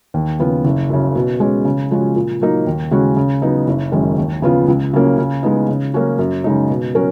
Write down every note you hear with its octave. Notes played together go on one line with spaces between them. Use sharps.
D#2
C#3 F3 B3 F4
F#1
F#2 C#3
B2
G#3 C#4
C#3
F3 G#3 C#4 F#4
A#2
F#3 A#3 D#4
D#2
C#3 G#3 C#4 F#4
C#3
F#3 B3 D#4
F#1
F#2 D#3 G#3 C#4
D#2
C#3 F3 B3 F4
C#2
C#3 F#3 A#3 C#4
C#3
G#3 B3 D#4
C#3
F#3 A#3 C#4 F#4
F#2
C#3 G#3 D#4
B2
F#3 C#4 F#4 A#4